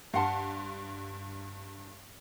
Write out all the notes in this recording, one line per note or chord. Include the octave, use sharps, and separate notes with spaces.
G2 F5 F#5 A5 C6